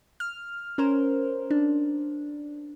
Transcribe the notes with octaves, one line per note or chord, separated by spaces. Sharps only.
F6
C#4 A#4 C5
D4